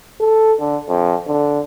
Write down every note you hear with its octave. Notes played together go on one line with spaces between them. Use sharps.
A4
D3
F2
D3